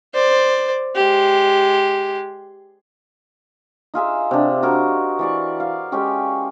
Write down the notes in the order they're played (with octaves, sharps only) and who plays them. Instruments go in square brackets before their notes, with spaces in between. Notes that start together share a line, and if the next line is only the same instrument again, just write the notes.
[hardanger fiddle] C5 D5
G#3 G4
[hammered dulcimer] D#4 F4 G#4 E5
C3 D4
D#4 F#4 A#4 C#5
E3 D5 C#6
F5
G#3 C#4 G4 C#5